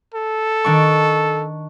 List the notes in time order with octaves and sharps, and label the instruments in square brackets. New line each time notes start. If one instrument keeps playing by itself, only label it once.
[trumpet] A4
[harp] D#3 D4 C#6